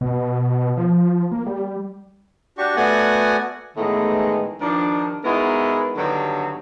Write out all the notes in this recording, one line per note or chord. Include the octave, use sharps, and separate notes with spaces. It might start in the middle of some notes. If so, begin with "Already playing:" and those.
B2
F3
A#3
G3
D4 F#4 G4 C#6
A3 B3 F#4 D5 F#5 G#5
A2 D#3 E3 G#3 A3 B3
G2 D#3 F3 D4
G#3 B3 D#4 E4 F#4 A#4
G2 D3 D#3 F#3 B3 D4